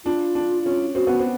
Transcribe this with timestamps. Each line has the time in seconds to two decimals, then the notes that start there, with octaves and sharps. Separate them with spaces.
0.05 D4 F4
0.35 D4
0.66 C#4
0.95 C4 F#4
1.07 B3
1.19 C4